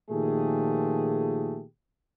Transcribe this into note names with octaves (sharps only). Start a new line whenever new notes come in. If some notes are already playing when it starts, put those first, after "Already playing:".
A#2 D#3 F3 A3 G4 G#4